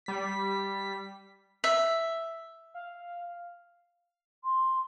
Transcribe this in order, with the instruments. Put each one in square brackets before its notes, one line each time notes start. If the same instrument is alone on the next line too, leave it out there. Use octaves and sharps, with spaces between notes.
[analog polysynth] G3 B6
[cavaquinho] E5
[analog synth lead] F5
[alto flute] C6